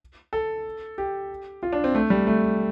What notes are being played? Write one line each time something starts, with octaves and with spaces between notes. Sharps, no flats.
A4
G4
F4
D4
C4
A3
G3
A3